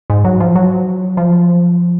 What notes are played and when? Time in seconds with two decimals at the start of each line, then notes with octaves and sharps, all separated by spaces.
0.10 G#2
0.25 F#3
0.40 F3
0.56 F#3
1.17 F3